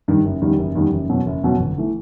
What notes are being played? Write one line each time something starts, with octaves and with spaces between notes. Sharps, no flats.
G2 D#3
F#1
E2 D#3 G3
F#1
E2 D#3 G3
F#1
E2 B2 F#3
F#1
E2 B2 F#3
G1
E3 A3